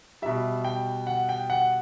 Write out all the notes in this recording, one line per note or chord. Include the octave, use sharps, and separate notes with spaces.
B2 G3 E5
G5
F#5
G5
F#5